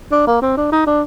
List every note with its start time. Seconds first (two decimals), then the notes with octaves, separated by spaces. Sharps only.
0.12 D4
0.27 A#3
0.42 C4
0.57 D4
0.72 D#4
0.86 D4